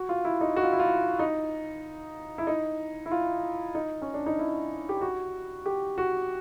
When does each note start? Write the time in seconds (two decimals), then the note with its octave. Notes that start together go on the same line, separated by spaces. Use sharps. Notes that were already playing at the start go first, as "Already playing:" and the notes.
Already playing: F#4
0.09 F4
0.25 E4
0.41 D#4
0.56 F#4
0.63 F4
0.72 E4
0.80 F4
1.19 D#4
2.38 E4
2.47 D#4
3.06 E4
3.12 F4
3.75 D#4
4.02 C#4
4.14 D4
4.26 D#4
4.39 E4
4.89 G4
5.01 F#4
5.66 G4
5.98 F#4